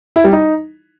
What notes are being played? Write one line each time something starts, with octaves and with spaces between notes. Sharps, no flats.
E4
G3
D#4